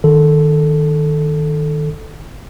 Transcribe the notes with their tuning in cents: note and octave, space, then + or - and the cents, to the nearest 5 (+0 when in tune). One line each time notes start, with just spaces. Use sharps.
D#3 -15 A4 -5